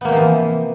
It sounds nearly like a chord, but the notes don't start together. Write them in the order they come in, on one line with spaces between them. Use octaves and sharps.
B3 A#3 C3 F3 E3